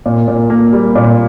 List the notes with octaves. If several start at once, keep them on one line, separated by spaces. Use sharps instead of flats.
A#2
A#2
A#3
G3
A#2